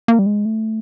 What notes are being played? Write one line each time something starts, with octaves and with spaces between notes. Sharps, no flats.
A#3
G3
G#3
A3